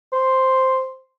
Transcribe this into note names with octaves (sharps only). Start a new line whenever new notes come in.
C5